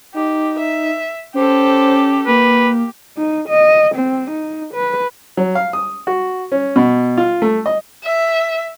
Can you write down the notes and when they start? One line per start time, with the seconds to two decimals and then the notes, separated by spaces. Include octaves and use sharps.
0.14 D#4 G4
0.59 E5
1.35 C#4 G4 A4 C5
2.27 A#3 G4 B4
3.17 D#4
3.49 D#5
3.95 C4
4.31 D#4
4.74 B4
5.37 F#3
5.55 F5
5.73 D#6
6.07 F#4
6.52 C#4
6.76 B2
7.17 F4
7.42 A3
7.66 D#5
8.04 E5